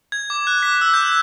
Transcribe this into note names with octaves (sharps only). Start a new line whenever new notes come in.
G#6
D6
F#6
B6
E6
G6